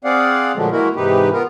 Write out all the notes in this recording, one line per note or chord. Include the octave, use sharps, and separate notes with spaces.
C4 G#4 D5 F5 F#5
A#2 D3 F3 F#3 G#3 A3
E3 G#3 A#3 E4 F#4 A#4
G#2 C3 E3 D#4 G4 B4
B3 F4 A#4